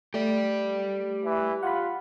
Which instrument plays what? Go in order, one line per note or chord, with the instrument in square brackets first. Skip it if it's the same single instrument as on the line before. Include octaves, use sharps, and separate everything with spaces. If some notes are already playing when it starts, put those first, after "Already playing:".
[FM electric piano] A3 [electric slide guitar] G4 D5
[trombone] E3
[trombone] F4 [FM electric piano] F#5 B5